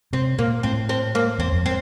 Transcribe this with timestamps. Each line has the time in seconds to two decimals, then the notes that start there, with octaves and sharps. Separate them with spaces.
0.13 C3 C4
0.38 A#2 A#3
0.63 A2 C4
0.89 C4
1.15 A#3
1.38 E2 C4
1.53 F2
1.66 C4